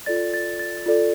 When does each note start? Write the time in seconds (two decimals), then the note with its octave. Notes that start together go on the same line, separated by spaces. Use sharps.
0.06 F4 A4 D5 A6
0.34 A6
0.59 A6
0.86 F4 A4 D5